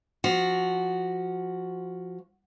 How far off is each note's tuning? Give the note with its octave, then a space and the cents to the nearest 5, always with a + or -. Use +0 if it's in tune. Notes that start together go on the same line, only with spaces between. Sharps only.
F3 +0 F#4 +0